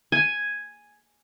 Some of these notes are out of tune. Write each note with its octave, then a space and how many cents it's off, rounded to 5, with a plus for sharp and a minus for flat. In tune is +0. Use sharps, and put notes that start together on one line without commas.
G#5 +0